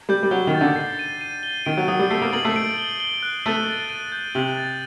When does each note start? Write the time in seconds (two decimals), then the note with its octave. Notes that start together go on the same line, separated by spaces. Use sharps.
0.09 G3 G6
0.23 G3
0.31 F#3 G7
0.47 D#3
0.54 A6
0.61 D3
0.76 C7
0.99 D#7
1.21 D#7
1.43 G7
1.66 D#3 D7
1.77 F#3
1.88 F#3 D#6
1.99 G3
2.10 A3 C7
2.22 A#3
2.33 A#3 F#7
2.45 A3
2.56 D7
2.78 G7
3.00 G7
3.23 F#6
3.45 A3 D#7
3.68 A6
3.90 D#7
4.12 G6
4.35 C3 F#7
4.57 A6